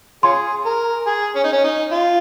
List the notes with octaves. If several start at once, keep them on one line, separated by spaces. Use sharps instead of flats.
C#4 F4 G#4 C6
A#4
G#4
C#4
D#4
C#4
D#4
F4